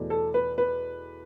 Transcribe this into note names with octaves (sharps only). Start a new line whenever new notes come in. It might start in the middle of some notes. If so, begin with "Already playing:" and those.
Already playing: E2 B2 A3
A4
B4
B4